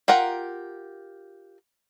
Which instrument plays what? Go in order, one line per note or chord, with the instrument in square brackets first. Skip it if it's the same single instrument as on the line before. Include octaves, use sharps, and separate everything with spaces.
[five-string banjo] F4 G4 A#4 F#5